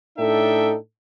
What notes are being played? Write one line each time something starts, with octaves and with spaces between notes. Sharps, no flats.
A2 D4 D#4 A4 E5 G5